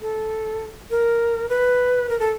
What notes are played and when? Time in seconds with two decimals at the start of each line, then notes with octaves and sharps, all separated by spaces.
0.02 A4
0.91 A#4
1.49 B4
2.09 A#4
2.20 A4